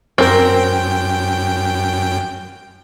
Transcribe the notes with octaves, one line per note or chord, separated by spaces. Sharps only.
F#2 C4 A#4 G5